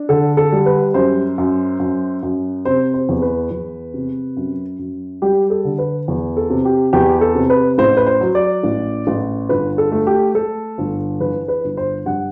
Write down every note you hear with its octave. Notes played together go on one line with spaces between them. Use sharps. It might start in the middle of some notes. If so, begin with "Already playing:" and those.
Already playing: D4
D3 A4
A4
G3
B4
F#2 C5
F#2
F#2
F#2
C3 C5
C5
E2
B4
E2
C3
F#2
F#2
G3 G4
A4
D3
B4
E2
A4
C3
G4
E2 G4
A4
C3
B4
A1 C5
B4
C5
F#3
D5
A1
A1
G1 B4
A4
A3
G4
A3 A4
G1
E3 B4
B4
G1
C5
G2 F#5